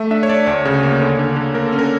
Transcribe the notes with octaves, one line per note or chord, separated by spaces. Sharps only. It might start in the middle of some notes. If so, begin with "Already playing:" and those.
Already playing: A3 E5
D4 E5
C#5
D4 D5
D2 C#5
C#3
A#3
D3
D3
D3
A#3 A#4
A4
C#4
A#4